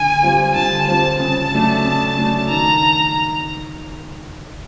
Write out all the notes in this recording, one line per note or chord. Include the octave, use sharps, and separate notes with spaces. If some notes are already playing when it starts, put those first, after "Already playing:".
Already playing: D3 G#5
G3 C4 F4
D3 A5
G3 C4 F4 A5
C#3 A5
F#3 A3 D4
C#3
F#3 A3 D4
D#3 A#5